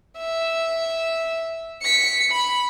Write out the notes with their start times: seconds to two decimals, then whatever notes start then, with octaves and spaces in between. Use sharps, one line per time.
0.18 E5
1.82 B6 C#7
2.32 B5